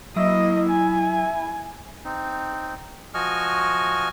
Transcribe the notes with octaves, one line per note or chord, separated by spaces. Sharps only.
F#3 A#3 E4 D#5 E6
G#5
C4 D#4
F3 F#4 D#5 G#5 C#6 F6